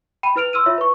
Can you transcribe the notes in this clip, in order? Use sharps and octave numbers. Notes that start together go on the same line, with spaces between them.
G5 B5 D#7
E4 B4 F6 D7 F7
C6 E6 F6 D#7
E4 F4 C#5 E5
B4 C#6